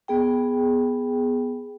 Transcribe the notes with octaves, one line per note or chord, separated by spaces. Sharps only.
B3 G#4 G5